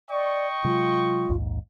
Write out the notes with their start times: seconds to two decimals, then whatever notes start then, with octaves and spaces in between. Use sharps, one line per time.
0.10 D5 D#5 G5 C#6
0.64 C3 F#3 G#3 F4
1.29 A#1 D#2 G#2